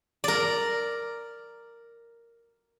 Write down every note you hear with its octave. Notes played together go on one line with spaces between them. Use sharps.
A#4 D5